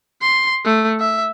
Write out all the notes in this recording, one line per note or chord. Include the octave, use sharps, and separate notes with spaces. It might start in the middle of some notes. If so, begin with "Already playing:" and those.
C6
A3
E5